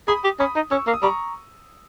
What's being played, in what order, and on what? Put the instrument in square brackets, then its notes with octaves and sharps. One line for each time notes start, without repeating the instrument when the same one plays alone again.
[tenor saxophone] G#4 [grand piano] B5 D#6
[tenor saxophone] G4
[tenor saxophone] C#4 [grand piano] B5 D#6
[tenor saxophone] D#4
[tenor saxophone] C#4 [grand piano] C#6 E6
[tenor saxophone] A#3
[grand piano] D#6
[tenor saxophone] G3 [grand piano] A#5 C#6